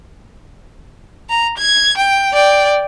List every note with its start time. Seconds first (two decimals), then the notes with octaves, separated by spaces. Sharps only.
1.29 A#5
1.58 G#6
1.97 G5
2.33 D5 G5